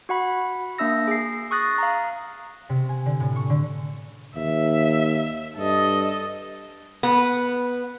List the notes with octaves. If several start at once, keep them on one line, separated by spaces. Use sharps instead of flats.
F#4 F#5 B5
A#3 D4 E5 E6 A#6
G#4 C7
C#6 D#6 F#6 A6 A#6
F5 A#5
C3
G#5
D3
A2
C#6
D3
D#2 E5
G2 A4 D#5
B3